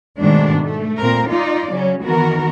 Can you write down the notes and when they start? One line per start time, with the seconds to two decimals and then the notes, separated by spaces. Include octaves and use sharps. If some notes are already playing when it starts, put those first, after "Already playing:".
0.19 G#2 B2 D#3 A3 D4
0.62 A3
1.00 A#2 C4 A#4
1.29 D#4 F4 D5
1.71 C#3 F#3 C#4
2.03 D#3 E3 B3 F#4 A#4